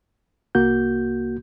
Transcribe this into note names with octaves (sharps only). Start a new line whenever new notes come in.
C2 A#3 F#4 G6